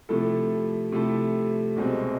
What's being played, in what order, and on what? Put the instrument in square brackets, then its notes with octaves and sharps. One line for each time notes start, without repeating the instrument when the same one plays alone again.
[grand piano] C3 F3 A3 E4 A4
C3 F3 A3 E4 A4
C2 B2 G#3 C4